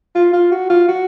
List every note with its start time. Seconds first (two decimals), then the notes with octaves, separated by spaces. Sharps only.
0.16 F4
0.34 F4
0.52 F#4
0.70 F4
0.88 F#4